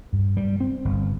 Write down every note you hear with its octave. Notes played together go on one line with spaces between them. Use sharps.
G2
G3
C4
G1